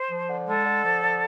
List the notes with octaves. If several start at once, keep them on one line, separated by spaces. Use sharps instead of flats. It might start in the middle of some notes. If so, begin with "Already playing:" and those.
Already playing: C5
F3
D3
G#3 A4
D3
F3
D3